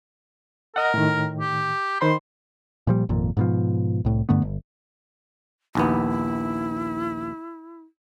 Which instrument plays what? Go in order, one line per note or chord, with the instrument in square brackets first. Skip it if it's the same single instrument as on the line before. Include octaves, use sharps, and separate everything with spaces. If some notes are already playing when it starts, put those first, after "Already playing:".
[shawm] A#4 [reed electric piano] D#5 F#5
[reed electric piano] A2 D#3
[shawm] G4
[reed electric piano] D#3 C5 B5 [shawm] C6
[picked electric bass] A#2 F3 G3
G#1 F2 A#2
G#2 B2 F3
C2 A2
G2 D3 A3 B3
G1
[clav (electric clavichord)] A#1 D#2 B3 [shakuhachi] E4